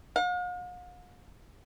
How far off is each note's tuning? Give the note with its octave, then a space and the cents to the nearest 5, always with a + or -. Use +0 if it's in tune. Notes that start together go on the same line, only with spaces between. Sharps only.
F5 +45